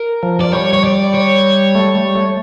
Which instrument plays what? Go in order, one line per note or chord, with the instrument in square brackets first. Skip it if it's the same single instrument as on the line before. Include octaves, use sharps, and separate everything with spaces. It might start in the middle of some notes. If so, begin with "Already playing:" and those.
Already playing: [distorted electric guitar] A#4
[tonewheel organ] F3
[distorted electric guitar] D5
[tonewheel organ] G3 [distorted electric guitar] C#5
[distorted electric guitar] C#5
D5
C#5
[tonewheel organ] A3
G3
A3